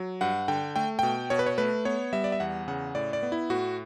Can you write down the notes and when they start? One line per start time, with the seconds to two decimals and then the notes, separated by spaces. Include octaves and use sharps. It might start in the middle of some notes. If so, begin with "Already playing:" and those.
Already playing: F#3
0.21 G2 F#5
0.48 D3 G5
0.76 A3 G5
0.99 B2 G5
1.30 B2 C#5
1.39 B4
1.46 C#5
1.58 A3 B4
1.85 B3 C#5
2.13 G3 E5
2.24 D5
2.32 E5
2.40 E2 F#5
2.68 C#3 F#5
2.95 A2 D5
3.13 D5
3.23 B3
3.32 E4
3.50 A2 F#4